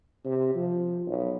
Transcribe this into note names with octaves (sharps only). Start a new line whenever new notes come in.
C3
F3
B1